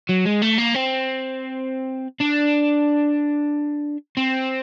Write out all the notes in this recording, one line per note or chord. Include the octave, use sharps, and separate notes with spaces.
F#3
G#3
A3
A#3
C4
D4
C4